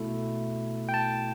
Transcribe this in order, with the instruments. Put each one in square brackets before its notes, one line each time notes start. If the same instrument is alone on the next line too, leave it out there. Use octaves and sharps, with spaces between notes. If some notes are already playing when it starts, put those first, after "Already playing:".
Already playing: [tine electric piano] B2 A3 E4
G5
A5